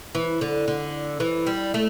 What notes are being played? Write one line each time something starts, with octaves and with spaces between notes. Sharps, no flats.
E3
D3
D3
E3
G3
A3